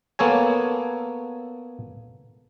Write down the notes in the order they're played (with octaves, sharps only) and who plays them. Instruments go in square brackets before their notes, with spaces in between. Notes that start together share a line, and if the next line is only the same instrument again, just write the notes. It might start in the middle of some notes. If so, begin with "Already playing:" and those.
[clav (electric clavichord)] A#3 B3 A4 C#5 G#5